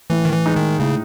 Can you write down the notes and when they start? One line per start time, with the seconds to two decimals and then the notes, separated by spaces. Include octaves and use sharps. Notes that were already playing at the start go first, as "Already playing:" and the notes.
0.10 A2 E3
0.25 D#3
0.33 E3
0.45 G#3 D#4
0.56 D#3
0.80 A2 C#3